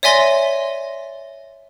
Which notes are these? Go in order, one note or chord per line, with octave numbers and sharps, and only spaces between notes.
C#5 D5 E5 G#5 C6 A#6